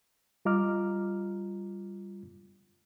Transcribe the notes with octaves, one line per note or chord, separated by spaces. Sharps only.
G3 F4 D#5 A#5 D6 F6